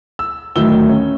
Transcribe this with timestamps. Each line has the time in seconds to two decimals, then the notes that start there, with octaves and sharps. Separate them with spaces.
0.19 E6
0.56 D2 A2 D#3 F#3 E6 G7
0.89 C#4